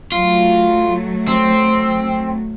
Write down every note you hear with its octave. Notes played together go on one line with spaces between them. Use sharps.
F#3 A3 F4
C4